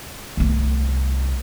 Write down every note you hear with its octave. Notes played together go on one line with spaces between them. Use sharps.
C2 A3